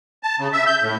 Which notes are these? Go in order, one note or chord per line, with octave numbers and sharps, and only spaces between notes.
A5
C#3
E5
G6
A2